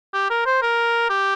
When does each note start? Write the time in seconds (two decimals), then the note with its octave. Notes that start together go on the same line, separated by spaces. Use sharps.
0.14 G4
0.30 A#4
0.46 C5
0.62 A#4
1.10 G4